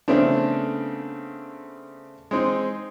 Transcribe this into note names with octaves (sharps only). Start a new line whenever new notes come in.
C#3 A3 B3 C4 D4
G#3 C4 D#4